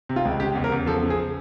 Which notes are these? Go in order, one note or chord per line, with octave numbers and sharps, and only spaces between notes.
C3
F4
C#2
C#3 G4
E2
A#4
E2
F3 A4
C#3
G#4